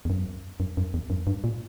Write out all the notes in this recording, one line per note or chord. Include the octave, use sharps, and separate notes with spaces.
E2
F#2
F#2
F#2
E2
F#2
G2
A#2